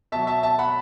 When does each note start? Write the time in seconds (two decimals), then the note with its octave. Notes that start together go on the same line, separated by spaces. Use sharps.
0.12 B2 F#3 E5 A5
0.27 E5 A5
0.43 E5 A5
0.59 F#5 B5